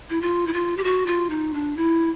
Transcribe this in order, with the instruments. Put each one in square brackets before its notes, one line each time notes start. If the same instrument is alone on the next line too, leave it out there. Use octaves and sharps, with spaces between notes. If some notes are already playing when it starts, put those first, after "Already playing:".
[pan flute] E4
F4
E4
F4
G4
F#4
F4
D#4
D4
E4